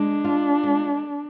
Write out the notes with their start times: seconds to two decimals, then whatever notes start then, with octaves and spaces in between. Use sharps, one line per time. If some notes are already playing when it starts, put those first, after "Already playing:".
Already playing: G#3 D4
0.24 F4
0.63 G#3